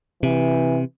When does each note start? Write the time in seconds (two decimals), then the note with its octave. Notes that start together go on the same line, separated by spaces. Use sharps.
0.23 C3 E3